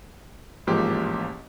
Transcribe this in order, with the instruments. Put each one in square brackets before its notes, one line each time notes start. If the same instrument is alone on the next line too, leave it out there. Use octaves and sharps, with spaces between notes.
[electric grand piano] A1 G#2 F3 A#3 G4